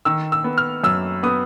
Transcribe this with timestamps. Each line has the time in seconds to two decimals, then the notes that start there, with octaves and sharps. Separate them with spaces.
0.05 D#3 E6
0.32 E6
0.44 B3
0.58 F6
0.84 F#2 E6
1.23 B3 D#6